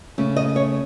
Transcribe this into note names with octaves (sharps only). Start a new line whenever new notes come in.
C#3 A3 C#4
D#5
C#5